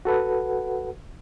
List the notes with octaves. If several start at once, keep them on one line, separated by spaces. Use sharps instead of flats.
F#4 A4 B4 F#5